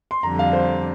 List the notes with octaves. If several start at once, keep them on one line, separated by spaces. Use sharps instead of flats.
C6
F2 D3 G3 A#5
F5
C5